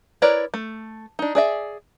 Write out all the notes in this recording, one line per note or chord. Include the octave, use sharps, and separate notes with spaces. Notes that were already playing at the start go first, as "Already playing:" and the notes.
E4 A#4 B4 C#5 D5
A3
D4 D#4
G#4 D5 E5